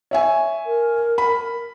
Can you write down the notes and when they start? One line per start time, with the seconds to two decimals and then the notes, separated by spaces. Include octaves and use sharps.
0.11 C#5 E5 G#5
0.66 A#4
1.18 B5